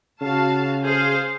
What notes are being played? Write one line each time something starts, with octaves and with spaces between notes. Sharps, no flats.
C#3 F#4 F5 A5
G#4 C5 F5